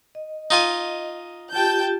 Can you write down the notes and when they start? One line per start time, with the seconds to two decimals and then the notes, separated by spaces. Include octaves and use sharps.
0.15 D#5
0.51 D#4 F4 G#5
1.53 F4 G4 G5 A5 G6